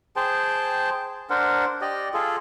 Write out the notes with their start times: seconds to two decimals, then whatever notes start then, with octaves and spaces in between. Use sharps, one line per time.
0.16 G#4 C5 G5 A5
1.30 D4 A#4 C5 F#5
1.81 G4 D5 D#5
2.14 F4 G#4 A4